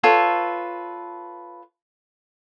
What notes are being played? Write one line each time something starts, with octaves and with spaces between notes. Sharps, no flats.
F4 A4 B4 C#5